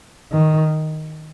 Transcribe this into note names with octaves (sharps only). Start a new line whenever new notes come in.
D#3